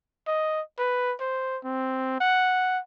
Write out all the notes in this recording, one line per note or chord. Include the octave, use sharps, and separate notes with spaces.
D#5
B4
C5
C4
F#5